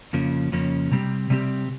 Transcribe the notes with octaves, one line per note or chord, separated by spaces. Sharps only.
F2 C#3 F3 A#3 C#4
F2 C#3 F3 A#3 C#4
C3 G3 C4 G4
C3 G3 C4 G4